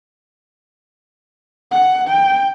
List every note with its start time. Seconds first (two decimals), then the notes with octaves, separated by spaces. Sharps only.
1.71 F#5
2.08 G5